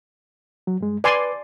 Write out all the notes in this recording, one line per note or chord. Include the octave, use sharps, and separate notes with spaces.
F#3
G2 G#3
B4 D5 G#5 C6